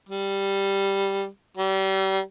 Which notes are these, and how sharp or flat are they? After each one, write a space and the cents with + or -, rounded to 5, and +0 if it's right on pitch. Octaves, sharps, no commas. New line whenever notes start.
G3 +0
G3 -35